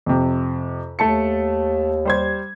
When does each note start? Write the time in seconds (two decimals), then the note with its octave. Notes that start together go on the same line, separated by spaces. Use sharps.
0.06 F2 C3
0.99 D#2 A3 A5 C#7
2.05 G3 C5 G#6